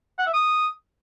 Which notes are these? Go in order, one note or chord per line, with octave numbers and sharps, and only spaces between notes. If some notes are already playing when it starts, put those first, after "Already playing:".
F#5
E5
D#6